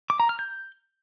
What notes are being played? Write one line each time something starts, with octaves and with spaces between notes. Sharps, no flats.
D6
A#5
F6
G6